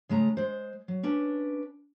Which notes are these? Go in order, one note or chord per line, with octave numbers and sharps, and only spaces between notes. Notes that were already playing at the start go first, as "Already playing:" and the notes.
C#3 G#3 A3 A#5
G#3 C5
F#3
C#4 D4 B4